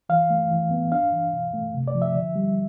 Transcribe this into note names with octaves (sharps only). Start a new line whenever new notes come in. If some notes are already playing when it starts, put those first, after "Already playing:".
E3 F5
A3
E3
B3
D4 F5
E3
B2
A3
C3
D5
F3
E5
D3
G3